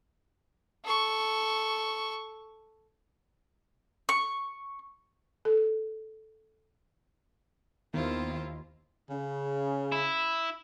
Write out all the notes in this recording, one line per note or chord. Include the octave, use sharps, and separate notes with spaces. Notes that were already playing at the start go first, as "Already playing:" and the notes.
A4 C#6
C#6
A4
D#2 D#3 B3 E4 F4 C5
C#3
E4